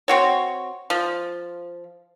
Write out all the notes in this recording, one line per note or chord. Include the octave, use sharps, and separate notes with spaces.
C4 F#4 C#5
F3